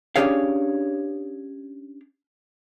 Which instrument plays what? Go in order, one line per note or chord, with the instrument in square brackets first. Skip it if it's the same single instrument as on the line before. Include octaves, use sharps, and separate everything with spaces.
[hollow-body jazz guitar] C#4 D4 G4 G#4 C#5 F5